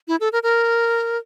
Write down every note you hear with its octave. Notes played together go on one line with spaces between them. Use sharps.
E4
A4
A#4
A#4